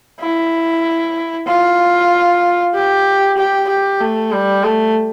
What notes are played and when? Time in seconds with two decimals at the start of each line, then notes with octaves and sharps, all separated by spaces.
0.21 E4
1.47 F4
2.74 G4
3.37 G4
3.69 G4
4.01 A3
4.32 G3
4.64 A3